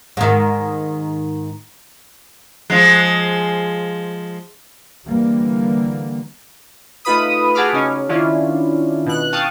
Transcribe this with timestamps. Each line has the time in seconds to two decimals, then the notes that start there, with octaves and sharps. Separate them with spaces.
0.17 G#2 D#3
2.70 F3 G#3
5.06 D3 E3 G3 A#3
7.05 A3 D#4 F4 B4 B5 D#6
7.55 F#4 G#4 A5 B5 D6 F6
7.73 C#3 C#4 D#4
8.09 D#3 C#4 D4 E4 F4
9.06 B2 F#6
9.32 F5 G5 A5 C#6 D#6